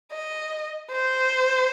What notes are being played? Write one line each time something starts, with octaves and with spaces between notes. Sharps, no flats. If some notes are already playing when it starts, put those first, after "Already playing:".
D#5
C5